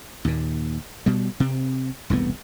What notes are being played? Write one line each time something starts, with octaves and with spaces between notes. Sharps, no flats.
D#2 A#2
B2 G3
C3 C4
E1 C2 A2 B3